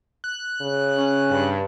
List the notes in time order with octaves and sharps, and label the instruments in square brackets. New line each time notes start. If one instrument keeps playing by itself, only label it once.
[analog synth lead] F#6
[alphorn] C#3
[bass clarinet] C#4
[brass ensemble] G2